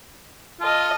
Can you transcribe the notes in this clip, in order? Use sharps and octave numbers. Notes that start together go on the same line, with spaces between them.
F4 A4 D#5